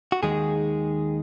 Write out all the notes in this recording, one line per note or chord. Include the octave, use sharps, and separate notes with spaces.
F#4
D#2 D#3 G#3 D#4 G#4